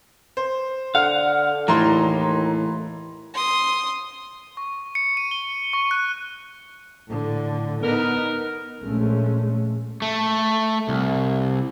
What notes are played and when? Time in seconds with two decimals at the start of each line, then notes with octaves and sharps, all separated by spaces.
0.37 C5
0.95 D3 F5 F#5
1.68 D#2 A2 E3 A#5 C6
3.34 C6 D#6
4.57 C#6
4.95 C#7
5.17 D#7
5.31 G7
5.73 C#6
5.91 F#6
7.08 A2 D3
7.83 B3 D#4 A#4
8.82 A#1 G#3 A3 C#4
10.02 A3
10.89 C2